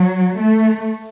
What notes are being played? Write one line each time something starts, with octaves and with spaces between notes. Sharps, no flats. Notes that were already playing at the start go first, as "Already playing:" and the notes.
Already playing: F#3
A3